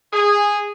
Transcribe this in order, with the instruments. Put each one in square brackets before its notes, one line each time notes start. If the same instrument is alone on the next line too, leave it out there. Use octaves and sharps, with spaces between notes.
[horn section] G#4